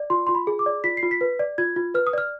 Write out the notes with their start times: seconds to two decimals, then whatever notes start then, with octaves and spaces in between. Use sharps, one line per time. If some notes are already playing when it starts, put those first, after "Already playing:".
Already playing: D5
0.10 F4 C6
0.27 F4 C6
0.35 B5
0.47 G#4
0.59 D6
0.66 D5
0.84 F4 B6
0.97 C7
1.03 F4
1.11 B6
1.21 B4
1.40 D5
1.58 F4 G#6
1.76 F4
1.94 B4 F6
2.07 D#6
2.13 D5 F6